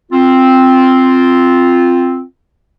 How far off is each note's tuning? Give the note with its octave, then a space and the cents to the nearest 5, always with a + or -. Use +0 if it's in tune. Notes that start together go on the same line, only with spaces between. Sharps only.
C4 +0 F4 +0